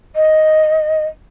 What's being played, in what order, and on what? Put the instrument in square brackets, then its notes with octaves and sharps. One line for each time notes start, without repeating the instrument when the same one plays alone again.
[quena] D#5